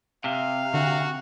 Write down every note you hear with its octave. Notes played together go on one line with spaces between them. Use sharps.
C3 F5
D3 F#4